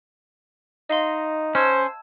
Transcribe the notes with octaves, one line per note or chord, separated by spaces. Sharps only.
D#4 D#5 F5 C6
C#4 C5 A5 E6 G#6